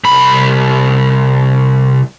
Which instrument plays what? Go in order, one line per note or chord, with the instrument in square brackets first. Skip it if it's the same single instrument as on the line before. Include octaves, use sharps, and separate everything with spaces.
[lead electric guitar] C2 B5